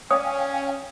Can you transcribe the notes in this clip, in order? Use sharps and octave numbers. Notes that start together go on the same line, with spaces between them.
C#4 C#5 D5 F5 G5 G#5 D#6